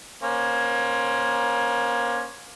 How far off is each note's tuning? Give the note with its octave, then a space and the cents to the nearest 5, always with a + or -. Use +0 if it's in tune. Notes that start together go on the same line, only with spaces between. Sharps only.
A#3 +30 C#4 +0 C5 +10